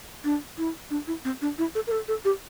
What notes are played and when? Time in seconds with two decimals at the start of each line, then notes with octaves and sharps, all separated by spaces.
0.24 D4
0.58 E4
0.91 D4
1.07 E4
1.25 C4
1.42 D4
1.58 E4
1.75 A4
1.87 A#4
1.92 A4
2.08 A4
2.25 G4